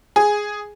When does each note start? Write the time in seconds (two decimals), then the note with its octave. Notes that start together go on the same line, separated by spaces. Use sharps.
0.16 G#4